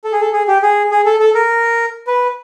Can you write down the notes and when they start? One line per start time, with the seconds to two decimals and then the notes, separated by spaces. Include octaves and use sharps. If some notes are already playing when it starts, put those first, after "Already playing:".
0.04 A4
0.12 G#4
0.21 A4
0.33 G#4
0.48 G4
0.62 G#4
0.91 G#4
1.06 A4
1.20 A4
1.35 A#4
2.07 B4